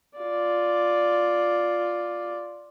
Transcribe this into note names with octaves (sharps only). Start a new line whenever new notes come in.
F4 D5